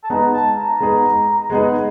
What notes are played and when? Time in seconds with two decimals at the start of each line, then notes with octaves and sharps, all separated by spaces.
0.04 A5
0.10 G#3 B3 D#4 G#4 A#5
0.33 A5
0.56 A#5
0.80 G#3 B3 D#4 G#4
1.50 G#3 B3 D#4 G#4